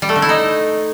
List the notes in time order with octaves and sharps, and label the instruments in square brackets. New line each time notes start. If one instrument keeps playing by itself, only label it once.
[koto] G3
A3
D3
E4
D#4